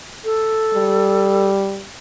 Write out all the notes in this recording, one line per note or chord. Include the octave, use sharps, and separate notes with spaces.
A4
G3